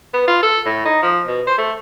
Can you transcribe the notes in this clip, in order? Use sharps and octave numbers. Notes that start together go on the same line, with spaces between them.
B3
F4
A4
A2
D#4
F3
B2
C5
A3